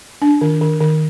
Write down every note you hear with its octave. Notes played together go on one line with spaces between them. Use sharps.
D4
D#3
D#3
D#3